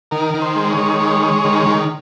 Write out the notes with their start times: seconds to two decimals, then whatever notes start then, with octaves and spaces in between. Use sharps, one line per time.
0.11 D#3 A#4
0.34 D#3
0.42 C5
0.56 G#3
0.70 C#5
0.78 D#3
1.00 G#3
1.22 G#3
1.45 D#3
1.66 D#3